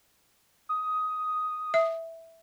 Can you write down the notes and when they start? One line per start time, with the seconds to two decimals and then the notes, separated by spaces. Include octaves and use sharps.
0.69 D#6
1.74 E5